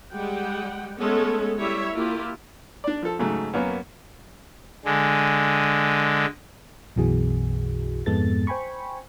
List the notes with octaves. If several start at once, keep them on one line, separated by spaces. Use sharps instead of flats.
G3 G#3 F#5 G5
G#3 A3 B3 C#4 A4
G3 E4 C#5 E5
A#3 E4 F4 G4
D4 D5
F3 A4
G#2 C#3 F#3 A3
F#2 A#3 B3 C#4
D3 G#3
B1 F#2 B2 E3 F#4 G#4
F2 G#2 G#3 B3 A4 A6
C5 G5 G#5 B5 C#6